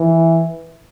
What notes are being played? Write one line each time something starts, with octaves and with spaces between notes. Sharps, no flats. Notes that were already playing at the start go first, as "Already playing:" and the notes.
Already playing: E3